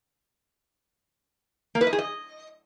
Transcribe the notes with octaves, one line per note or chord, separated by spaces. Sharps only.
A#3
B4
D#5
G#4
D#5